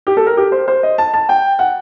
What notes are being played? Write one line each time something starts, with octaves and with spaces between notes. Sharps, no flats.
G4
A4
A#4
G4
C5
C5
D#5
A5
A5
G5
F#5